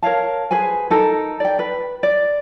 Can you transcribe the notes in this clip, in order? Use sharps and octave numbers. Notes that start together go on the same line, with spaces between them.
A#4 C#5 F5 A5
G#4 B4 C5 G#5
D#4 A4 A#4
D5 G5
B4
D5